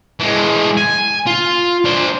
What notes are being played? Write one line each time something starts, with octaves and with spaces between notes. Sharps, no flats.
E3 G#3
G#5
F4
D4 C5